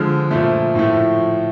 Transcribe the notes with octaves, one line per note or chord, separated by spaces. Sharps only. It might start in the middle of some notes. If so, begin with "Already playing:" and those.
Already playing: D3 F3 G#3 F6
A#2 F3 A3
A2 F3 A3